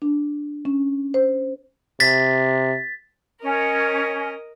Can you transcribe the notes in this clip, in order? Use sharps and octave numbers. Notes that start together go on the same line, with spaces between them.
D4
C#4
C5
C3 A6 B6
C#4 A#4 D#5